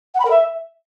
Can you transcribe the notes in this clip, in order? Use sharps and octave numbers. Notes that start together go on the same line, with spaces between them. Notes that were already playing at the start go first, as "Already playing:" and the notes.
F#5
B5
A#4
E5